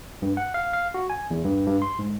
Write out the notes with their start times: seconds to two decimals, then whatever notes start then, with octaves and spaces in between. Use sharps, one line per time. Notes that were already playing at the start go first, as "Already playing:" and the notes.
0.22 G2
0.37 F#5
0.54 F5
0.73 F5
0.94 F#4
1.10 G#5
1.31 E2
1.44 G2
1.67 G2
1.82 C6
1.99 G#2